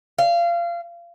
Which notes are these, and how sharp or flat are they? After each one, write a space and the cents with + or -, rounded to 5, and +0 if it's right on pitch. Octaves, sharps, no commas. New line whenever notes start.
F5 -25